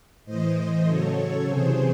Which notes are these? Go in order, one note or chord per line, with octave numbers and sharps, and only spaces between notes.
A2 E3 C5 D#5
C#3 F#3 A4 C#5
A4 C#5
C3 E3 G#4 C5